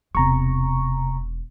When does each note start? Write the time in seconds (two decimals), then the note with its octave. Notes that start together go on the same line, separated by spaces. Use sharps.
0.15 E1 C3 A#5 C#6